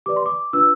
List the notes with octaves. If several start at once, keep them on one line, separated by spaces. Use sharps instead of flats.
G4 B4 D5 D6
C6
D6
D4 F4 B4 E6